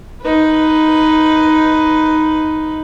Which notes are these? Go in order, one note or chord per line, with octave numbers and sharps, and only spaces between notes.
D#4 B4